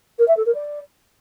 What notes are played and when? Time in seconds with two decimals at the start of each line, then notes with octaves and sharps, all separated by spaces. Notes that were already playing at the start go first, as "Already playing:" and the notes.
0.19 A#4
0.28 E5
0.37 A4
0.46 A#4
0.55 D5